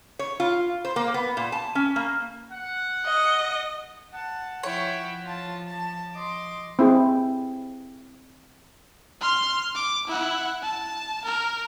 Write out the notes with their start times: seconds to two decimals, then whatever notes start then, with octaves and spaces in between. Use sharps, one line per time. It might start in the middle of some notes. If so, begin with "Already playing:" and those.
0.19 C#5
0.40 F4
0.85 C5
0.96 A#3
1.14 B3
1.37 A#2
1.52 A5
1.75 C#4
1.96 A#3
2.52 F#5
3.07 D#5
4.14 F#5 A5
4.63 F3 E4 C#5 G5
5.24 F4 A5
5.68 A5
6.15 D#5 C6 D6
6.79 C4 E4 G#4
9.21 C6 F6
9.75 D6
10.07 E4 F#5
10.62 A5
11.25 A#4